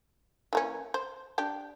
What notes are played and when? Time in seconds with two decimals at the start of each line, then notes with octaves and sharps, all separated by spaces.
0.53 E3 A#3 C#4
0.94 C5
1.38 D4 G4